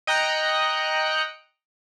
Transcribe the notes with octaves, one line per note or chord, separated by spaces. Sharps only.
D#5 G5 A#5 F#6 C#7